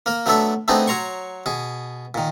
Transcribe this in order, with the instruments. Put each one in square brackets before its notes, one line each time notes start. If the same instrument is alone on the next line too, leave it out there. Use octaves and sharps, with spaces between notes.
[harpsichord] A#3 A#4
F#3 A3 B3 D4 A4 E5
A3 B3 C4 D4 D#4 G#4
F#3 C#5 A#5 C6 C#6
B2 G#4
A#2 D#3